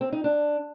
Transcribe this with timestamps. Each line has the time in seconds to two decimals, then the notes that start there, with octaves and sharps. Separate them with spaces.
0.01 C4
0.12 D#4
0.24 D4